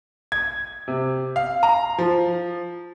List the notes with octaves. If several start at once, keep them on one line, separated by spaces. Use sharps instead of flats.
G#6
C3
F5
A#5
F3